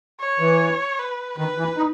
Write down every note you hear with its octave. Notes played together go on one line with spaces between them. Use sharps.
C#5
E3
B4
D#3 B4
E3
D#4